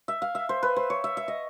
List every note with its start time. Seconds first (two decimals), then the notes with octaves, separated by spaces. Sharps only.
0.08 E5
0.22 F5
0.35 E5
0.49 C5
0.63 B4
0.76 C5
0.90 C#5
1.04 E5
1.17 E5
1.28 D#5